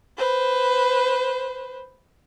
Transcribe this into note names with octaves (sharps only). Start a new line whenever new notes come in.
B4 C5